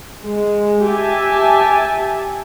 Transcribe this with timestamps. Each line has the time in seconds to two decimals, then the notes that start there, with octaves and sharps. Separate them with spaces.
0.23 G#3
0.82 G4 E5 G#5 A5